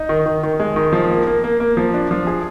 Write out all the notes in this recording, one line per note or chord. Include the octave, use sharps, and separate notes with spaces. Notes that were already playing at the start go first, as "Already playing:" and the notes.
Already playing: D#4
D#3
D#3
D#3
G#3
D#3
F3
A#3
A#3
A#3
A#3
F3
D4
F3
G#4